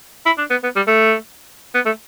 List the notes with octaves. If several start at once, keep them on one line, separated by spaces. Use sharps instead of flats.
E4
D4
B3
B3
G3
A3
B3
A3